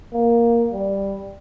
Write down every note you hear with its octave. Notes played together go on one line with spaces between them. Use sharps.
A#3
G3